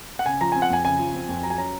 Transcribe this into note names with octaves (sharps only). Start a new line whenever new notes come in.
F#5
C#3 G#5
F3 A#5
C4 G#5
F#5
F2 G#5
C#3 G#5
F3
C4
F2
F#3 A#5
G#5
C#4 A#5